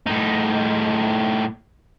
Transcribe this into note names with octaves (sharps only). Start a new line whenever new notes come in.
A2 D#4